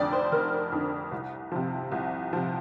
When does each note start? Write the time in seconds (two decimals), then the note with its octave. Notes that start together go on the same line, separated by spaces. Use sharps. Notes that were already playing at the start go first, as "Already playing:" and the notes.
Already playing: F1 F2 D3 D5 G5
0.12 C5
0.32 F1 A#4
0.72 F2 D3
1.11 C2
1.52 C3 F3
1.92 C2
2.33 C3 F3